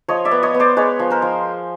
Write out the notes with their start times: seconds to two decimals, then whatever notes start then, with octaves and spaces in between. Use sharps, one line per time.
0.08 F3 C#5 D#5
0.25 D5 E5
0.31 B3
0.43 C#5 D#5
0.54 B3
0.60 C5 D5
0.77 G#3 B4 C#5
0.99 F3
1.10 A#4 C5
1.22 F3